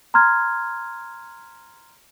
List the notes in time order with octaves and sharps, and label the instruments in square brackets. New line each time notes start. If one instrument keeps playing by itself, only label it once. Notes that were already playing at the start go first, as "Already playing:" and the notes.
[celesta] A#5 C6 F6 G#6